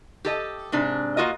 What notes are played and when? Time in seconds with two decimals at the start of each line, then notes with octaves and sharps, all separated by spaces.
0.25 G4 A4 D#5
0.72 G#2 C3 D4
1.17 A#3 F4 F#4 D#5